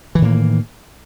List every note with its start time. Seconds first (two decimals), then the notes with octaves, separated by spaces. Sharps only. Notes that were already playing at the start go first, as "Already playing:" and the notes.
0.15 E3
0.18 D#3
0.22 A2
0.25 A#3